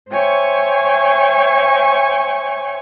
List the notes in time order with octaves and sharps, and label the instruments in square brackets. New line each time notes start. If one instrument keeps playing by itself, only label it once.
[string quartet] C5 C#5 E5 G5 G#5 C#6